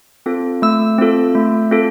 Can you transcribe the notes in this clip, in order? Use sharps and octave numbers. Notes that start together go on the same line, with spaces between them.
C4 F4 A4
A3 E6
C4 F4 A4
A3
C4 F4 A4